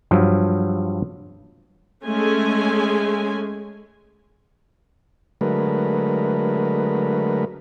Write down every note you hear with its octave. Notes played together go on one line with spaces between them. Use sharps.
G2 F3 F#3
G#3 A3 C#4 G#5
D3 F#3 G#3 A3 A#4 B4